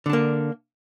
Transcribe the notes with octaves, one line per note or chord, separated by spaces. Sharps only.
D3 A#3 D4